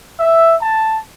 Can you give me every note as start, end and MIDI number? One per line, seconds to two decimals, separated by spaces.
0.18 0.56 76
0.61 0.98 81